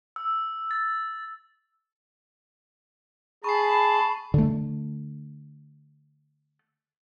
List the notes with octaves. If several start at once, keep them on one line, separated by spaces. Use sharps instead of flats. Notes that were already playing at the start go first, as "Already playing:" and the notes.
E6
A6
G#4 A5 B5 C#6 C7
D3 A3